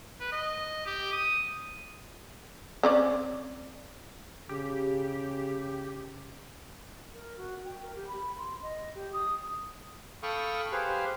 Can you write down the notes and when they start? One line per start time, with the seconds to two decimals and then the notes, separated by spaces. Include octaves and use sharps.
0.20 B4
0.32 D#5
0.86 G4
1.12 D#6
2.83 C4 C#4 D5
4.49 C#3 G4
7.14 A#4
7.37 F#4
7.65 G5
7.82 A#4
7.95 G4
8.07 B5
8.38 C6
8.62 D#5
8.95 G4
9.13 D#6
10.23 A4 F5 G5 B5 C#6 D#6
10.72 G4 G#4 B4 C5 F5